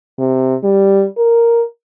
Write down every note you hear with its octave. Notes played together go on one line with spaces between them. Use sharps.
C3
G3
A#4